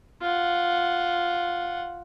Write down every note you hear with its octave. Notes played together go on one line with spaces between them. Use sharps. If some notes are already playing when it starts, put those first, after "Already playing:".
F4 F#5